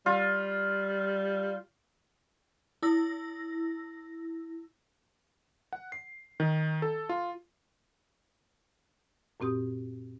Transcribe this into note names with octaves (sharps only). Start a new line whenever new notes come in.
G3 F4
E4 E6 A#6
F#5
C7
D#3
A4
F4
F#2 A#2 C4 G4 D#6